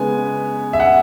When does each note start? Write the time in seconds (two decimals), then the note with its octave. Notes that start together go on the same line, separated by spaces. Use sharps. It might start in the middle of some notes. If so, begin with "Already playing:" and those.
Already playing: C#3 G#3 B3 G#5
0.73 E5
0.80 F#5